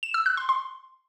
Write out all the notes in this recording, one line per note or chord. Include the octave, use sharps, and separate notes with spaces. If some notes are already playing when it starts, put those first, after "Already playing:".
E7
E6
F#6
C6
C6